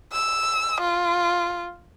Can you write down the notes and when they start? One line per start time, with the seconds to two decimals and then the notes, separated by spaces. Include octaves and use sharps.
0.13 E6
0.81 F4